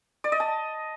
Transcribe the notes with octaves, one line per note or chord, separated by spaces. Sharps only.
D5
D#5
A5